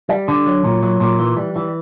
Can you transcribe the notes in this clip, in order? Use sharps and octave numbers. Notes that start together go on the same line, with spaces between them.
G3
D3
F#3
A#2
F#3
A#2
E3
G3
E3